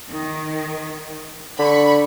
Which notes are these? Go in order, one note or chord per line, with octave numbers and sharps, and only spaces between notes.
D#3
D3 B5 C#6